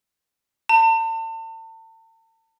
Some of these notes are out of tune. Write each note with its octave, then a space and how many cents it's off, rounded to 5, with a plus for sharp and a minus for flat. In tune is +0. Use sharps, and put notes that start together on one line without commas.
A5 +40